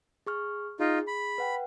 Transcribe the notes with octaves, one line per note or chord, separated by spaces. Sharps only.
G#4 C#6 F6
D#4 F4 G#4
B5
B4 F#5 G5